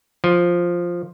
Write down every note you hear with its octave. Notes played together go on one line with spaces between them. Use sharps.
F3